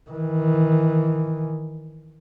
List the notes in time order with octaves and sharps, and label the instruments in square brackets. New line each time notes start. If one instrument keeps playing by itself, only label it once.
[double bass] D#3 E3